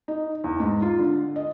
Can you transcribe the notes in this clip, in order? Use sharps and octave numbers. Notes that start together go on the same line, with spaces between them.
D#4
E2
G#2
F4
D3
D#5